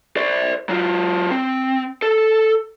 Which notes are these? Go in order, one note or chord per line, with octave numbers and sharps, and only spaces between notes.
C5 D5
F#3 F4
C4
A4